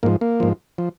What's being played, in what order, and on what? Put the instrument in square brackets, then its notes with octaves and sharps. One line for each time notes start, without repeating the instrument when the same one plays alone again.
[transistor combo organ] G#2 F3 A#3
A#3
G#2 F3
F3